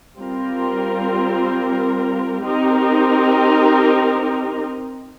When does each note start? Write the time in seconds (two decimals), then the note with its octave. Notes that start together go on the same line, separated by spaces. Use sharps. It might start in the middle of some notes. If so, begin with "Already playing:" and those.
0.18 G3 C4 F4 A#4
2.44 C4 D#4 G4 A#4